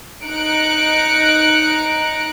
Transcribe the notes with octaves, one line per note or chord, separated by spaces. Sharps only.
D#4 A#5 F#6 C#7 D7